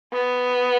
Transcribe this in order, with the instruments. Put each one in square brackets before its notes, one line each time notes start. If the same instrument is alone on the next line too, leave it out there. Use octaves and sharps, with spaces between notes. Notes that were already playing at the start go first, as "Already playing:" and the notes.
[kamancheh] B3